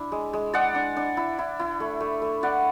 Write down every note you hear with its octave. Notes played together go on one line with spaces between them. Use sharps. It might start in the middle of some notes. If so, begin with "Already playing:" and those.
Already playing: D4 E4
G#3
G#3
G#3 D5 F#5
D4
D4
E4
E4
E4
A3
A3
A3
E4 D5 F#5